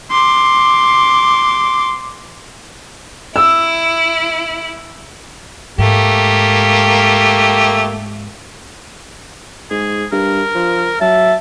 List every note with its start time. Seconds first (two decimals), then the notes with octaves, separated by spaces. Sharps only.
0.11 C6 D6
3.36 E4 E6
5.78 G#2 A3 A#3 G4
9.70 G#2 G#4
10.12 G2 A#4
10.55 F3
11.01 F#3 E5 A5